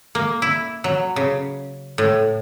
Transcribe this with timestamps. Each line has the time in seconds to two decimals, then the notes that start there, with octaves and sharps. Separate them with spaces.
0.15 A#3
0.42 E4
0.84 F#3
1.16 C#3
1.98 A2